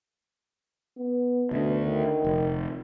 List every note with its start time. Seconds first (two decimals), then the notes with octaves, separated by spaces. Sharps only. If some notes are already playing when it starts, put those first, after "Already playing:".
0.98 B3
1.51 D2 B2 D3
1.86 D#3
2.24 F1